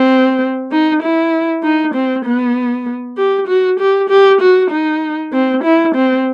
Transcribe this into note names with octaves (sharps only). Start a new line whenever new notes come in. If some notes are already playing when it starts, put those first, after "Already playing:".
Already playing: C4
D#4
E4
D#4
C4
B3
G4
F#4
G4
G4
F#4
D#4
C4
E4
C4